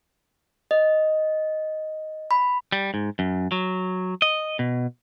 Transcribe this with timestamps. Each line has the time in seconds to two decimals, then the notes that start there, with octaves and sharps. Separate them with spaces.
0.71 D#5
2.31 B5
2.72 G3
2.94 G#2
3.19 F#2
3.52 F#3
4.22 D#5
4.59 B2